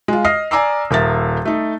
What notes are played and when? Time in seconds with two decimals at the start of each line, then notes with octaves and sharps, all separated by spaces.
0.08 G#3 F4
0.25 D#5 D#6 F6 A#6 C7
0.51 D5 G#5 A#5 D6 E6 C7
0.91 D#1 A#4 E5 A6
1.45 A3 D#4